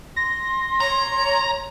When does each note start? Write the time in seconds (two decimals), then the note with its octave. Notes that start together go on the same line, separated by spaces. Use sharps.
0.16 C6 A#6
0.80 C#5 A#5